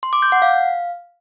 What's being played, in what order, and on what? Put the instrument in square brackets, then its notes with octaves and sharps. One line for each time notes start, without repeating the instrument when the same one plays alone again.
[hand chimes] C6
D6
G6
F#5
F5